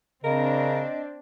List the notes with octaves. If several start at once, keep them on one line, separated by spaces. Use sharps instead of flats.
C#3 C4 D4 A#4 D#5